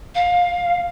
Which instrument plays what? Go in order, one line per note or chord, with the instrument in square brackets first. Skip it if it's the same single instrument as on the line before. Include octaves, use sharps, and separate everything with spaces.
[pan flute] F5